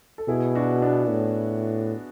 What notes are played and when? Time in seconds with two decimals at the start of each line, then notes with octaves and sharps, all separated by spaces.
0.18 A4
0.28 B2 E4 G#4
0.55 D4 F#4
0.82 B3 D4
1.10 A2